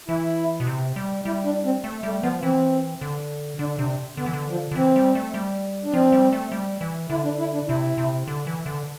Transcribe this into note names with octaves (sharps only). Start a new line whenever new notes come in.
E3 E4
B2
C3
G3
G3 E4
D4
C4
A3
G3 A3
F3 B3
E3 C4
D3
D3 D4
C3 D4
D3 B3
E3
D3
F3
D3
E3 C4
G3
A3
G3
D4
F3 C4
G3
A3
G3
E3
D3 E4
D4
E4
D4
C3 E4
C3
D3
E3
D3